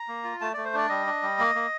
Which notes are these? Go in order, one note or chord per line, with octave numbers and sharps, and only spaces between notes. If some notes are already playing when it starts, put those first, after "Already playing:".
Already playing: A#5
A#3
F4
A3 A5
A3 D5
C5
D4 D5
G3 D#5
D4
G3
A#3
A#3